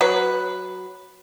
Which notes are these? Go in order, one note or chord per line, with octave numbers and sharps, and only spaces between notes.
F#3 B4